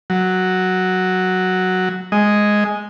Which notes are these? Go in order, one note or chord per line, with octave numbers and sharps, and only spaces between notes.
F#3
G#3 D#5